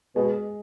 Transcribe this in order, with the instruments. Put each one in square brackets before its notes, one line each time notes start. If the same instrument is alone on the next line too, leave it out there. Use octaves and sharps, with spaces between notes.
[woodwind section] B2 [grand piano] G#3 G#4